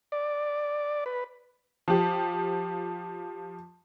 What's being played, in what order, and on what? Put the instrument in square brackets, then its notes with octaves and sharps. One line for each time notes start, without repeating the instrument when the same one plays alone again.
[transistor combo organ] D5
B4
[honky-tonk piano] F3 G4